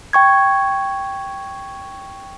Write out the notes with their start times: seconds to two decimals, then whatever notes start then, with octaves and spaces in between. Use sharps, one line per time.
0.13 G5 C#6 G#6